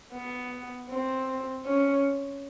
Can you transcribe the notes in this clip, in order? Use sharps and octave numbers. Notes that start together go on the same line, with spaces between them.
B3
C4
C#4